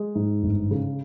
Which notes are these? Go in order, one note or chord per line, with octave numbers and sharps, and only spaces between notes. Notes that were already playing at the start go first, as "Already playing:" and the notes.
Already playing: G#3
G#2
G1
C#3